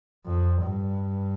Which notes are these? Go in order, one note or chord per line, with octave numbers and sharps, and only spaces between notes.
F2
G2